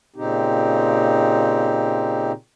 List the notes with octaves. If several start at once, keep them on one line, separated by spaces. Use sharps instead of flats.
A#2 C#3 C4 D#4 G4